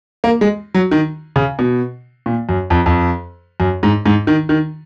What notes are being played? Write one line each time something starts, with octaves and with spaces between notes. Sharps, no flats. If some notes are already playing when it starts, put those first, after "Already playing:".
A#3
G#3
F#3
D#3
C#3
B2
A#2
F#2
F2
F2
F#2
G#2
G#2
D#3
D#3